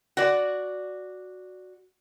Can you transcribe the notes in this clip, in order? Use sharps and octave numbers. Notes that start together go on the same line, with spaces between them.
F#4 D5